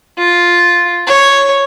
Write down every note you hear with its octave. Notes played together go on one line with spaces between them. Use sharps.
F4
C#5